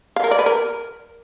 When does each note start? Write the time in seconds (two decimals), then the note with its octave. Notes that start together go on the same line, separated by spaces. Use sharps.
0.16 F5
0.24 A#4
0.31 D5
0.39 B4
0.46 A#4